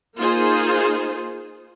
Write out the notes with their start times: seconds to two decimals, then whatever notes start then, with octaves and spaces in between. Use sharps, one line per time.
0.16 A#3 D#4 F4 G#4 C5